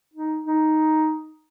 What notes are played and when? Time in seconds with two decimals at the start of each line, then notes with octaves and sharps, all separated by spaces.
0.14 D#4
0.46 D#4